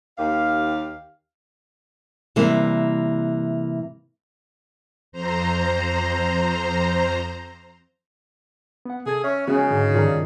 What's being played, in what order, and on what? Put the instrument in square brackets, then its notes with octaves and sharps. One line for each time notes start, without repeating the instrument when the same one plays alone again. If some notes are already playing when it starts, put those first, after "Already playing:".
[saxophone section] D#2 G4 F5
[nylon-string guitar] C3 E3 G3 A#3
[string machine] F2 C5 A#5
[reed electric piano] B3 F#5
[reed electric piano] C3 A4 G#6 [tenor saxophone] G#4
[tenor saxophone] C#4 [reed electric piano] E5 C#6
[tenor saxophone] C#3 [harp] G#3 F#4 G#4 [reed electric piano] B3 C#4
[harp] G#2 [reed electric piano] D3
[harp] G2 D#3 [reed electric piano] F4 D5 A#5